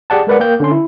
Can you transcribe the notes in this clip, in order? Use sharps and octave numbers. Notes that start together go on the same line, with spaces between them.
G4 G#4 D5 F#5 A5
G#3 A#4 B4 D5 F#5
A#3 G5 G6
D3 C#4 C6
E4